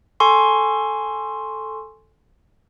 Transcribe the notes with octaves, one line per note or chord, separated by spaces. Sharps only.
A4 G#5 C6 C#6